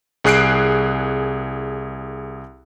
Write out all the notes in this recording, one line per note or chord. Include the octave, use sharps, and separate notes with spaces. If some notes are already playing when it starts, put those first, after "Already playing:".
C2 G#4 F#6 C7 D7